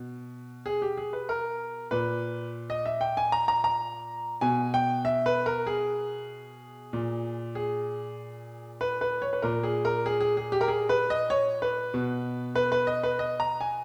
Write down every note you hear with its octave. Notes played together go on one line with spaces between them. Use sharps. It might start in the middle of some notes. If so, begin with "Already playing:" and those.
Already playing: B2
G#4
G4
G#4
B4
A#4
A#2 B4
D#5
E5
G5
G#5
A#5
A#5
A#5
B2 G#5
G5
E5
B4
A#4
G#4
A#2
G#4
B4
B4
C#5
B4
A#2 A#4
G#4
A#4
G#4
G#4
G#4
G4
A#4
G#4
B4
D#5
C#5
B4
B2
B4
B4
D#5
B4
D#5
A#5
G#5